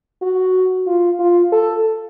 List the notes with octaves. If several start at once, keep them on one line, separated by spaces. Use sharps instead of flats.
F#4
F4
F4
A4